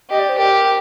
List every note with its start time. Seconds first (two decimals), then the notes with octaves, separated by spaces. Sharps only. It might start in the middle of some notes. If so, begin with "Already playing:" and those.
0.10 G4 D#5
0.19 D5
0.29 C5
0.38 G4 A#4